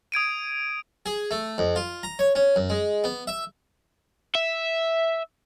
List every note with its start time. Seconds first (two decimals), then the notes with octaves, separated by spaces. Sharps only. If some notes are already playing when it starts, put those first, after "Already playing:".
0.12 D#6 G#6 D7 D#7
1.06 G#4
1.31 A3
1.58 F2
1.76 F4
2.03 A#5
2.19 C#5
2.35 C#4
2.56 F#2
2.70 G#3
3.04 B3
3.27 E5
4.35 E5